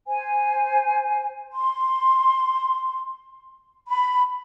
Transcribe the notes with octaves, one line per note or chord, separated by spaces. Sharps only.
C5 G#5
C6
B5